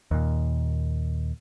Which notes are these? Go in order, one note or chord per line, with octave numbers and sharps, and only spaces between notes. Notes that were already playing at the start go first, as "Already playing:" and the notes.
D#2 A#2